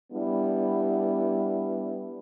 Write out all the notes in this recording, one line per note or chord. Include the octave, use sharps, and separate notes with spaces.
G3 B3 D4 E4